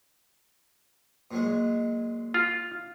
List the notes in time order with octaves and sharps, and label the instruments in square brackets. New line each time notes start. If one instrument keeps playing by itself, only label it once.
[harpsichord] A#2 F#3 G#3
[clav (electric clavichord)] F4